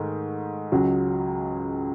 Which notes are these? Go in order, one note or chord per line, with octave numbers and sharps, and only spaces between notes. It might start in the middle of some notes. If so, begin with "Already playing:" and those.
Already playing: G#2 D#3 A3
C#2 C#3 F#3